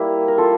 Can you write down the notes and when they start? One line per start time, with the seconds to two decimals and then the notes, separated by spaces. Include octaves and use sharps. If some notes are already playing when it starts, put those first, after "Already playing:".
Already playing: G3 A#3 E4
0.28 A#4
0.38 F4 A4